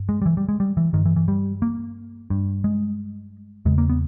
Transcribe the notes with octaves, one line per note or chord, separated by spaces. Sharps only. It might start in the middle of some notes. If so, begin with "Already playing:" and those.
Already playing: G2
G#3
G3
E3
G3
G#3
G3
E3
G2 D#3
E3
E3
G3
A#3
G2
G#3
E2 C#3 G#3
A#3
B3